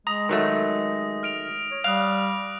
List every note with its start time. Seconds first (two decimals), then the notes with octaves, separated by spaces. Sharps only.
0.07 G#3 A#5 D#6 A#6
0.29 D#3 F#3 A3
1.23 F6 D7 F7
1.71 C#5
1.84 G3 F5 D#6 F#6 F7